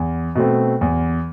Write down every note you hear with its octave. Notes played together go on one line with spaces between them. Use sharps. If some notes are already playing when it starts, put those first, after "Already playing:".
Already playing: E2
B2 A3 C4
E2